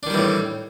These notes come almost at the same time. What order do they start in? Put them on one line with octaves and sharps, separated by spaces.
D4 D#3 G3 E3 A2